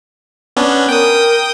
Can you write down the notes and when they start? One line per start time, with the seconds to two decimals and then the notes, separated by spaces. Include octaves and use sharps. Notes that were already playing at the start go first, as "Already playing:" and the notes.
0.57 B3 C#4 D4
0.89 A#4 G5 D#6